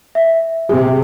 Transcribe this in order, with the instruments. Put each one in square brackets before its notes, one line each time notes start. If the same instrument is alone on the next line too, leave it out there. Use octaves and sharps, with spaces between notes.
[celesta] E5
[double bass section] C3 [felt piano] G#4